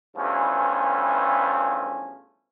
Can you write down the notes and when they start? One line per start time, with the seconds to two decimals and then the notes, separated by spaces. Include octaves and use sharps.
0.17 E2 G2 F3 A3 C#4